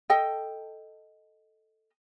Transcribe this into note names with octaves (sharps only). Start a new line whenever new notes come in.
A4 D#5 G5